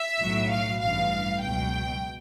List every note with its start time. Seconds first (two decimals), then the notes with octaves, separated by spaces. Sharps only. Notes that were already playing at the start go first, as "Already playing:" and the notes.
Already playing: E5
0.20 B1 A2 F#3
0.51 F5
0.81 A1 G2 E3 F5
1.42 C#2 B2 F#3 G5